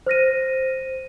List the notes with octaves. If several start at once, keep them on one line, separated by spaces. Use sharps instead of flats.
C5 F6 A#6 D#7